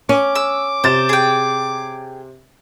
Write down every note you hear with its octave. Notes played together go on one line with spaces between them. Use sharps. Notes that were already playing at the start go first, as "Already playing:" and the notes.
C#4 D6
E6
C3 C5 A6 E7
G#4 G5